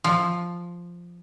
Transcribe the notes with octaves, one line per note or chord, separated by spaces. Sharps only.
F3